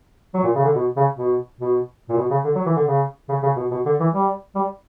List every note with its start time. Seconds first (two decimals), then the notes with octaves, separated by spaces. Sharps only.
0.34 F#3
0.44 A#2
0.55 C#3
0.65 D3
0.76 B2
0.97 C#3
1.19 B2
1.61 B2
2.09 A#2
2.17 B2
2.31 C#3
2.45 D3
2.55 F#3
2.66 E3
2.76 D3
2.87 C#3
3.29 C#3
3.43 C#3
3.57 B2
3.71 B2
3.86 D3
4.00 E3
4.14 G3
4.55 G3